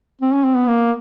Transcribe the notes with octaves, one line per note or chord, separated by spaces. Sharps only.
C4
C#4
C4
B3
A#3